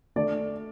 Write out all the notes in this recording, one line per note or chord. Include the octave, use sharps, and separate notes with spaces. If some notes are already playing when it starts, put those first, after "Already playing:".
D3 A3 D5